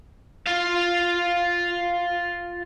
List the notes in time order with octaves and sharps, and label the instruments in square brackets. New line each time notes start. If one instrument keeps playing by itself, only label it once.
[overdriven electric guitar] F4 F5